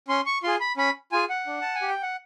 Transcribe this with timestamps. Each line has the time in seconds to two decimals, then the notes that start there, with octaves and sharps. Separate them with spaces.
0.08 C#4 C6
0.26 C#6
0.43 F4 G#4 C6
0.60 B5
0.77 C#4 B5
1.12 F4 G#4 G#5
1.29 F#5
1.47 D4
1.61 A5
1.75 G#5
1.82 G4
1.88 G5
2.03 F#5